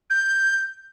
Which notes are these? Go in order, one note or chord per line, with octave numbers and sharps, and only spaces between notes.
G6